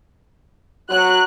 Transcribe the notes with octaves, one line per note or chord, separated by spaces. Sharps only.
F#3 F#6